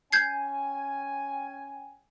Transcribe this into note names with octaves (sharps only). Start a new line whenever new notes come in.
C#4 G5 G#5 G6 G#6 C7